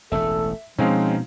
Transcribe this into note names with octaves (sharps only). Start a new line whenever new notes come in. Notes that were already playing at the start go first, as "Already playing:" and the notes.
E1 A1 A3 A4 E5
B2 F3 G#3 C4 C#4 D#4 F5